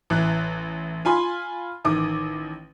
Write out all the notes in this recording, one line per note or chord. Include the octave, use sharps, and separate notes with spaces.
A1 E3 F#6
F4 G#5 B5 C6
A1 D#3 D6 D#6